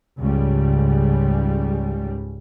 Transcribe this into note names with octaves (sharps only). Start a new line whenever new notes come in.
C#2 G#2 C#3 G3